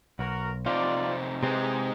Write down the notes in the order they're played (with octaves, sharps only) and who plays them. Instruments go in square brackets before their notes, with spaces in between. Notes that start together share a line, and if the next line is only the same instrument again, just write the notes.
[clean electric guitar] B1 [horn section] F#4 A#4
[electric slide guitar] F2 C3 D#4 [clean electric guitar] F4 [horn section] D5
[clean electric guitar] C3 C4 [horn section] E3 G#4 [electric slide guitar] G#3 D#4